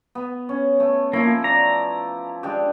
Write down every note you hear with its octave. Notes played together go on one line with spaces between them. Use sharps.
B3
C#4
A3
F3 A#3 E4
D5 A#5
G#3 D4 G4